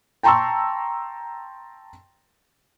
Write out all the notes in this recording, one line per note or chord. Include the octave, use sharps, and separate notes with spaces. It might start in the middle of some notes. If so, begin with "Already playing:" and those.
G5 A5 A#5 C6 C#6 E6